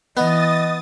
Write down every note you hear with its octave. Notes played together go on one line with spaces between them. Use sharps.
E3 B3 D#5 D#6 A6